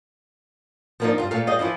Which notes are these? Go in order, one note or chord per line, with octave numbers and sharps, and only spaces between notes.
F3 G3 A#3 B3 D4 D#4
G2 F4
A#2 A3 A4 F5
G3 G#4 D#5 F5 G5
E3 F3 E4 F4